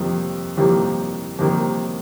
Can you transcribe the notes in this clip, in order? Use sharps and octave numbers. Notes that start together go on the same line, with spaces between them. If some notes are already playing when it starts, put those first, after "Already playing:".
Already playing: F2 C3 D#3 G3 A#3
F2 C3 D#3 G3 A#3
F2 C3 D#3 G3 A#3